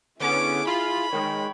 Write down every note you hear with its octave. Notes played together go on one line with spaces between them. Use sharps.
D3 B3 C#4 E4 G#4 D6
F4 B5
D#3 G#3 C#5 G5